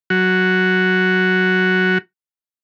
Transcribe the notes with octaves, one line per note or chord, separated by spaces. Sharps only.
F#3 F#4